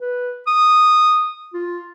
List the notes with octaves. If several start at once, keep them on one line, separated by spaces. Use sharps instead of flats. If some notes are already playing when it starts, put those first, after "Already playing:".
B4
D#6
F4